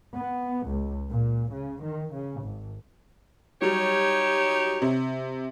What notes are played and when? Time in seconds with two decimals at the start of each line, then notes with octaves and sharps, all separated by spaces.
0.16 B3
0.68 C#2
1.10 A#2
1.52 C#3
1.83 D#3
2.12 C#3
2.42 G#1
3.62 F#3 G3 D#4 G4 C#5
4.82 C3